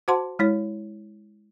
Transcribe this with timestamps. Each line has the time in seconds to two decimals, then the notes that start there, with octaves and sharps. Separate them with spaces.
0.08 F#4 C5 F#5 A5 C6
0.39 G#3 E4 C#5